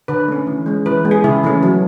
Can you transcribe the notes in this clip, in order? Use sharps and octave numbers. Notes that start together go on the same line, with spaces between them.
D3 B4
A3 C#4
E3
G#3 C#4
E3 B4
G#3 B3
G#4
C#3 E4
E3 A3 C#4
F#3